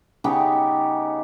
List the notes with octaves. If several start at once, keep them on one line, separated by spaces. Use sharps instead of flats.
C#3 B3 D#4 G4